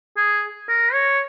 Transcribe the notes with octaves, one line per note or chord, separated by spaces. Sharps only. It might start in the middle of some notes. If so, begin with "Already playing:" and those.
G#4
A#4
C#5